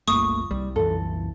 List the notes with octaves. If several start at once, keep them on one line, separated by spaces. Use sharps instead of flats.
G1 C#2 A3 A#3 C#6 D#6
C2 G3
F#2 A#2 E3 A4